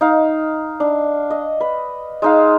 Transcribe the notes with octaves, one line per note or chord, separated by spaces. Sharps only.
D#4 F5
D4
D#5
B4
G#3 D#4 F5